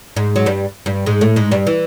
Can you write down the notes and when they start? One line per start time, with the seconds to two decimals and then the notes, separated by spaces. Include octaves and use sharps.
0.16 G#2 G#3
0.36 F#3
0.46 G2 G3
0.86 G2 G3
1.06 G#2 G#3
1.21 A2 A3
1.36 G#2 G#3
1.51 G2 G3
1.67 E3